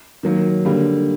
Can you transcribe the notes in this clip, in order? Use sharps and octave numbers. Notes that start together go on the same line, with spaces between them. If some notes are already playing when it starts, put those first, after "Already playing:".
D#3 F#3 A#3
D3 G3 A#3